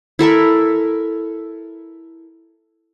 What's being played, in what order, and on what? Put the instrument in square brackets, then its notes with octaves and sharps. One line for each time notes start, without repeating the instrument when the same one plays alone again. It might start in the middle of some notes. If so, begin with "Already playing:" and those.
[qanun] E4 A4 A#4 E5